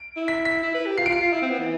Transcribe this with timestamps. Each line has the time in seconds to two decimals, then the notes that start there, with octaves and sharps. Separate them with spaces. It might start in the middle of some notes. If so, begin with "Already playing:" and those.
Already playing: D7
0.16 E4
0.28 B6
0.45 B6
0.63 E4
0.74 B4
0.86 G4
0.98 F4 C7
1.06 D7
1.09 F4
1.12 C7
1.21 F4
1.33 E4
1.42 C4
1.50 B3
1.59 E3